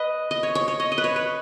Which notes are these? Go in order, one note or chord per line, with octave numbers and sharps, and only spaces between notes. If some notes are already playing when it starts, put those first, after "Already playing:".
Already playing: B4 D#5
D#5
C#5
C#5
C#5
D#5
D#5
B4
C#5
B4